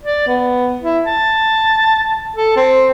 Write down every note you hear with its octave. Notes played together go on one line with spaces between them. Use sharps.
D5
B3
E4
A5
A4
C4